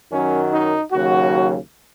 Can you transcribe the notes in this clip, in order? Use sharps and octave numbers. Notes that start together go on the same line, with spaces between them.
F#2 D#3 F#3 C#4
D#4
D#2 C#3 F#3 F#4